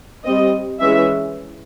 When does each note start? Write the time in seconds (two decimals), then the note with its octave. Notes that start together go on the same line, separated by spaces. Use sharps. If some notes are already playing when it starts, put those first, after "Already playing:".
0.24 G3 C4 D#5
0.80 E3 G#3 C#4 E5